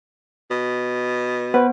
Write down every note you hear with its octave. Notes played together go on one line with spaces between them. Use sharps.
B2
B3 B4 C5